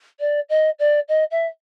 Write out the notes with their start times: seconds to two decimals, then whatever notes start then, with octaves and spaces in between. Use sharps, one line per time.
0.19 D5
0.49 D#5
0.79 D5
1.08 D#5
1.31 E5